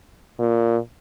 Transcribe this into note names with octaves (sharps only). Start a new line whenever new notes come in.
A#2